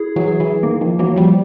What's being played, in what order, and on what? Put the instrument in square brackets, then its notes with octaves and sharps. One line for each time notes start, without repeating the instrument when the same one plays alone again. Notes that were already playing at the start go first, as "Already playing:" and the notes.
Already playing: [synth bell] E4 G#4
[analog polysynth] E3 F#3
[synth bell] G#4
[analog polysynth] E3
[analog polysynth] D#3 [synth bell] A#3
[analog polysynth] D#3 F3
[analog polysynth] E3 F#3 [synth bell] A#3
[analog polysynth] F3 G3